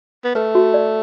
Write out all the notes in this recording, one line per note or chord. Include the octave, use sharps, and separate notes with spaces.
B3
A3 B4
F#4
D5